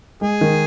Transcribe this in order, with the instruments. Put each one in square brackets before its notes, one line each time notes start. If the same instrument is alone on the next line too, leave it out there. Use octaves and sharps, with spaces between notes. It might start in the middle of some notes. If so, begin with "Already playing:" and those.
[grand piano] G#3 [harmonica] G#4
[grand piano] D#3